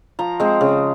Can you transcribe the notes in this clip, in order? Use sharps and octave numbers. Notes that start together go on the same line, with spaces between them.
F3 A#5
G#3 C4
C#3